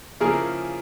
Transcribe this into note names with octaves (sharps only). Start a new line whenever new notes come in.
C#3 F3 A#3 C#4 E4 G#4 A#4